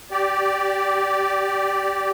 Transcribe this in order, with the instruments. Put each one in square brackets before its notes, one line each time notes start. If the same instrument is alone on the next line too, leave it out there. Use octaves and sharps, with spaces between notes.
[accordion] G4 D5